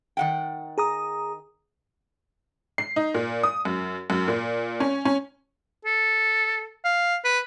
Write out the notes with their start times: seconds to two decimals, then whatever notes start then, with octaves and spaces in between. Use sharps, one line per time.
0.17 D#3 F#5 G5
0.78 G#4 A#5 D#6
2.78 C7
2.96 D#4
3.14 A#2
3.43 D#6
3.65 F#2
4.10 F#2
4.28 A#2
4.80 C#4
5.05 C#4
5.85 A4
6.84 F5
7.24 B4